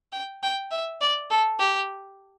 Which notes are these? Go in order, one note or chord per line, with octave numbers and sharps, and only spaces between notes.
G5
G5
E5
D5
A4
G4